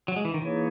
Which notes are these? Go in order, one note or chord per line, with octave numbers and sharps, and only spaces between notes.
F#3
G#3
E3
D#3
E3 A#3 D#4 G#4 C#5